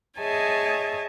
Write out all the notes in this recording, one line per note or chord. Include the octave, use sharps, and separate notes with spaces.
G#4 C#5 D#5 E5 G#5 A5